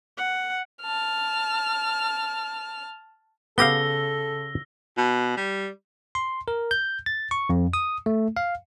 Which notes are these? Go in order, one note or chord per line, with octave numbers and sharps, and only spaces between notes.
F#5
A5 F6
C#3 B3 G4 A4 F5 E6 A#6 G7
B2
G3
C6
A#4
G6
A6
C#6
F2
D#6
A3
F5